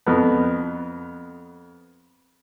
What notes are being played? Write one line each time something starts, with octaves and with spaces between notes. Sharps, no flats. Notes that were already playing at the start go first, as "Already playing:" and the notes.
F2 B3